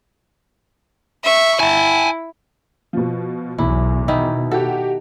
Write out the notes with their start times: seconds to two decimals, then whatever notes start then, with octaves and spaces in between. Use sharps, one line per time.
1.24 E5 C#6
1.60 E4 G#5 A5
2.93 B2 F3
3.58 B1 E2 E4
4.08 B2 D#3 D#4 E4
4.51 F#4 G4 A4